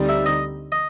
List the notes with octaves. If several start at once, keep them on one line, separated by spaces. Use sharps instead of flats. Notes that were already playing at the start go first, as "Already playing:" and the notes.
Already playing: D2 D3 G3 C4 D#4
E5
D#5
D#5